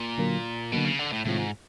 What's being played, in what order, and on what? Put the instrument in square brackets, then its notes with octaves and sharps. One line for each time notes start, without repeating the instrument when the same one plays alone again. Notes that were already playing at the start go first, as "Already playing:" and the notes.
Already playing: [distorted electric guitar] A#2
[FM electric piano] D3 F#3 A#3
[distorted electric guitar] B2 [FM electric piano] D3 F#3 A#3
[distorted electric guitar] C#3
D3
A2
[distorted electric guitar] A2 [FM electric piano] C3 D#3 G#3 C4 F4
[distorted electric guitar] G#2